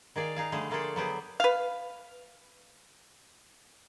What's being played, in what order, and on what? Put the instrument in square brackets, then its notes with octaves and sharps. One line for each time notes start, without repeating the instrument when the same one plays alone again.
[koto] D#3 G#4 D5 F5
D#4 G#4 F5
D3 F3 G3 A3 G#4
A3 A#3 F4 G#4 A4 D5
F#3 B3 G4 G#4
[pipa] B4 F5